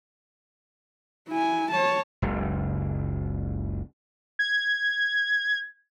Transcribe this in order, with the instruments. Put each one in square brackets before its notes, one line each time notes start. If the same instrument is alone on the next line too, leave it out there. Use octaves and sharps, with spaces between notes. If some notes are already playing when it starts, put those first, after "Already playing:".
[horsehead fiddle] E4 G#5
C#5 A5
[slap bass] F#1 C#2
[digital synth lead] G#6